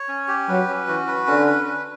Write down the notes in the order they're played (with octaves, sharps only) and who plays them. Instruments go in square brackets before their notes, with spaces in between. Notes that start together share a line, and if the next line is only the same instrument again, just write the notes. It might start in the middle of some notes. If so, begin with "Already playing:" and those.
Already playing: [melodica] C#5
C#4
G4
[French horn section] F#3 [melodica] B4
[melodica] C#4
[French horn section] E3 [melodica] F#4
[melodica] B4
[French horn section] D3 [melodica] C#4
[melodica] B4
B4